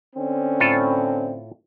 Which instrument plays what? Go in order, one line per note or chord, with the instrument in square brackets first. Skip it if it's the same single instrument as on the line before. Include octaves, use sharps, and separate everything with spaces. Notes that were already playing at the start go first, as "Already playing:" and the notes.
[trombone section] D3 C4 C#4
[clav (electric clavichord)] A2 F4 A4